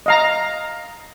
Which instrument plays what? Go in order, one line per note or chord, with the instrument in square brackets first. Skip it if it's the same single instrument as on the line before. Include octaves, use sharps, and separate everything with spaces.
[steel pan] D#5 F5 A#5